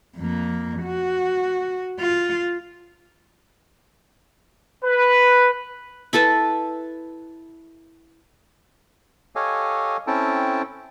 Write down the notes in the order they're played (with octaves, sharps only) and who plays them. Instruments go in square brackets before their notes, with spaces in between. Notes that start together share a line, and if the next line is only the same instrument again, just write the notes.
[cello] F2 A#3
F#4
F4
[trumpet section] B4
[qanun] E4 A4 B4 A5
[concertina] G4 A4 C#5 D#5 F5 G#5
C4 C#4 E4 A4 G5 A5